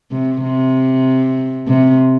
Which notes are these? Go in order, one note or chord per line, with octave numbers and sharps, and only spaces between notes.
C3
C3
C3